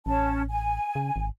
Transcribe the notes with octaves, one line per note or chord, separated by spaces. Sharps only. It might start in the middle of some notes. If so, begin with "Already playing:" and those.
A1 C#4 A5
G#5
C#3
G#1